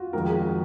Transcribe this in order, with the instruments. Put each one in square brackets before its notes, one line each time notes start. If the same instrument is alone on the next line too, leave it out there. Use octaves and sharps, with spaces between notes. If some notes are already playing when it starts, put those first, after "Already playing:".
Already playing: [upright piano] F4 F#4
[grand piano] F2 D#3 G#3 [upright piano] A#4
[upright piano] G#4
F#4